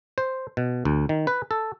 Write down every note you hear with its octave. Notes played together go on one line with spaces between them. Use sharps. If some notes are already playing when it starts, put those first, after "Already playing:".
C5
B2
D2
D#3
B4
A4